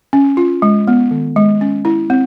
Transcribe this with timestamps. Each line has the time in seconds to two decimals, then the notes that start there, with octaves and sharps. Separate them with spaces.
0.13 C#4
0.37 F4
0.62 G#3
0.88 B3
1.11 D#3
1.36 G#3
1.61 C#4
1.85 E4
2.10 C4